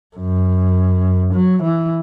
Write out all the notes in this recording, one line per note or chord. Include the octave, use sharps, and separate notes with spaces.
F#2
F#3
E3